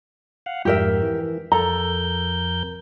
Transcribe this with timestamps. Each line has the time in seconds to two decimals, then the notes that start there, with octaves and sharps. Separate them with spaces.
0.46 F5 F#5
0.65 F2 G#2 G4 A#4 E5
1.02 E3
1.52 F2 A4 A#4 A#5 G6